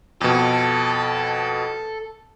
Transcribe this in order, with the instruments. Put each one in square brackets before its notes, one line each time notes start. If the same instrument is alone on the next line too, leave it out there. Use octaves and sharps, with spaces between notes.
[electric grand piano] F2 B2 [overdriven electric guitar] A4